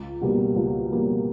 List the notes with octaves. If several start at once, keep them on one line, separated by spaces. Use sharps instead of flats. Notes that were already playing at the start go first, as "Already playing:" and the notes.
Already playing: C#2
B2 G3 A#3
C#2
B2 G3 A#3